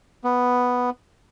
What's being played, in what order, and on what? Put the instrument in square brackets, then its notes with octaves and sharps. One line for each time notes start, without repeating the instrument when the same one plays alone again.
[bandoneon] B3